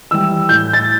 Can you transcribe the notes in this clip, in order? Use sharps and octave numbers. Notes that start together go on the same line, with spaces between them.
E3 G3 E6
A2 G6
A6